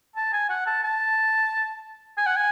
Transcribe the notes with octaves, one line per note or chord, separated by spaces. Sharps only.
A5
G#5
F#5
A5
A5
G#5
F#5
G#5